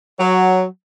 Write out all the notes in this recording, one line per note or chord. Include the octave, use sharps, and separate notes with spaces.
F#3